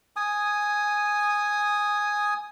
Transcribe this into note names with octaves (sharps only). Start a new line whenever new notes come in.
G#5 D#6